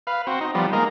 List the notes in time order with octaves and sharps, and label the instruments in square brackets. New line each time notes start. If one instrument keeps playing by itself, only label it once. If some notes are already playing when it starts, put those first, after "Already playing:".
[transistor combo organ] B4 F5
C4 F#4
D#4
F3 G3 B3
G#3 A#3 D#4 A#4